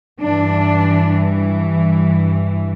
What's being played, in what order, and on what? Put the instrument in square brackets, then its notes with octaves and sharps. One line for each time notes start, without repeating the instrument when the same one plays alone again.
[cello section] G2 E3 D4